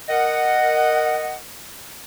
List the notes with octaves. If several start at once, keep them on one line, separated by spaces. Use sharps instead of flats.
A#4 D#5 F#5